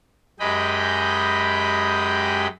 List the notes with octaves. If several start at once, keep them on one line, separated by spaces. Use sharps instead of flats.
F#2 G#3 G4 D#5 G5 B5